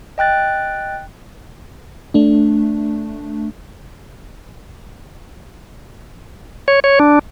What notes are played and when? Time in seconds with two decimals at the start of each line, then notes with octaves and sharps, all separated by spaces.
0.18 D#5 G5 F#6 A6
2.14 A3 D4
6.68 C#5
6.84 C#5
7.00 D4